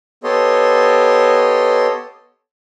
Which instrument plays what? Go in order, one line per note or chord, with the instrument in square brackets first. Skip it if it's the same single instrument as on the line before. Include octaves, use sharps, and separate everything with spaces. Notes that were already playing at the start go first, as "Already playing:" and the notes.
[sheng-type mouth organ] B3 G4 A4 C#5 D#5 C6